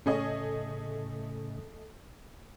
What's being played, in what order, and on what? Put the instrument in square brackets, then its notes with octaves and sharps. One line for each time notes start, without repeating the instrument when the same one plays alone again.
[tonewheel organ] A2 C#3 [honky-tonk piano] A3 G#4 D#5 [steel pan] C#4